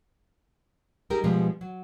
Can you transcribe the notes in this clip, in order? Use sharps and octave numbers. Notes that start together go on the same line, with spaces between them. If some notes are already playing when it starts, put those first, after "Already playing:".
G3 D#4 G4 G#4 A#4
B2 F3 G3 G#3 B3
F#3